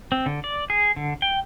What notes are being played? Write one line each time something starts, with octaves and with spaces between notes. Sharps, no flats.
C4
D3
D5
G#4
D3
G5